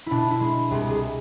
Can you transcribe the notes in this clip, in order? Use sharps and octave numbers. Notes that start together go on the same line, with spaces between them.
B2 D4 E4
E4
G#3
C2 G#4
G#4